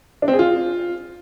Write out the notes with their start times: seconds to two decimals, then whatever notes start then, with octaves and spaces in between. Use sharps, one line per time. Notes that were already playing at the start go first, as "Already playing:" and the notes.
0.22 D4
0.28 C4
0.33 G#4
0.39 F4